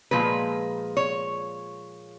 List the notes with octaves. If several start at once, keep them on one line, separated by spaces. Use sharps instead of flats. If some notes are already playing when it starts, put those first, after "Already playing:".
A#2 F3 G#3 B4
C#5